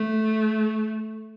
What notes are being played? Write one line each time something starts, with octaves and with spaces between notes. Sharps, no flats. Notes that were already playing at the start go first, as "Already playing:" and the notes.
Already playing: A3